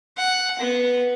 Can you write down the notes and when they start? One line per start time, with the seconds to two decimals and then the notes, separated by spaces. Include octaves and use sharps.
0.18 F#5
0.59 B3